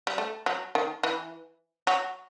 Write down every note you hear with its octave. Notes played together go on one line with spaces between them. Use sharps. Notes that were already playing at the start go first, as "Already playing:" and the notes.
G3
A3
F#3
D#3
E3
F#3